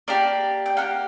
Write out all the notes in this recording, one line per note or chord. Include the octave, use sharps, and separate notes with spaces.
A#3 D4 G4 D5
G5
A#3 D#4 G4 F#5